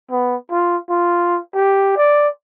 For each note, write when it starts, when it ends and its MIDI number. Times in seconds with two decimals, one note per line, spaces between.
0.11 0.36 59
0.51 0.77 65
0.90 1.39 65
1.55 1.96 67
1.97 2.28 74